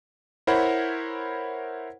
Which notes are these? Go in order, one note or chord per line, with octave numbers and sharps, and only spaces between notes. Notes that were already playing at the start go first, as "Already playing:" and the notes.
E4 A#4 C5 C#5 F#5 B5